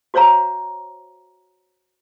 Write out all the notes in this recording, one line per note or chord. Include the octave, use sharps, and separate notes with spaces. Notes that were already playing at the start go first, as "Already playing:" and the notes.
F#4 C5 C#5 F5 A#5